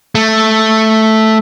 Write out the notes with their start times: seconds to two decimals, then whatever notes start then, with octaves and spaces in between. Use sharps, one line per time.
0.15 A3